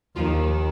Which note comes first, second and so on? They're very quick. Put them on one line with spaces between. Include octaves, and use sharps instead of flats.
D#2 F3 F4 D#3